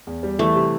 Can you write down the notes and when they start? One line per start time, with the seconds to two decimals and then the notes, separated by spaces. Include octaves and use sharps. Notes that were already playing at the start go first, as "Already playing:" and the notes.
0.07 E2
0.23 G3
0.39 E3 A3
0.56 C3